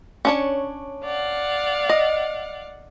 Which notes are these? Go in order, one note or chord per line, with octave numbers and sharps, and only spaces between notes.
C#4 D4 C#5
D5 F5 F#5
D#5